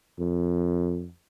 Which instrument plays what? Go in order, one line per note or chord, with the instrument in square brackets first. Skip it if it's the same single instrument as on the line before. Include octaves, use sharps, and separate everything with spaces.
[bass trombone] F2